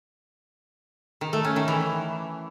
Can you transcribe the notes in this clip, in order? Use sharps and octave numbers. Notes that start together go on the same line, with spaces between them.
D#3
A3
C#4
D#3
E3